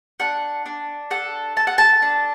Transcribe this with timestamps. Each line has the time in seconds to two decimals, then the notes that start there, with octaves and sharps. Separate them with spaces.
0.20 D4 F#5
0.66 D4
1.11 A4 F#5
1.57 A4 A5
1.67 F#5
1.78 A5
2.02 D4